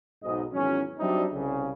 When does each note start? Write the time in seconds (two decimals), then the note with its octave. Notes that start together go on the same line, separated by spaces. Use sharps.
0.23 B1 G#2 D#5
0.52 G#1 E2 F#3 C#4
0.98 F#3 G3 C4 D4 D#4 E5
1.33 C2 C#3